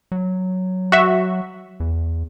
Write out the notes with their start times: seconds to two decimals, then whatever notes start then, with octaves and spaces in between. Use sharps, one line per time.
0.12 F#3
0.92 F#4 E5
1.80 E2